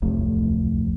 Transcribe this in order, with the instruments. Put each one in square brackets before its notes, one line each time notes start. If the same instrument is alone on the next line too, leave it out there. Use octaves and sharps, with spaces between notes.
[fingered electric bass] D1 C2 F2 A3